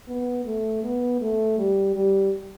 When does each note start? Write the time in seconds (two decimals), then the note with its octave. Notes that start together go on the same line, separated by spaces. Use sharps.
0.08 B3
0.46 A3
0.84 B3
1.21 A3
1.58 G3
1.96 G3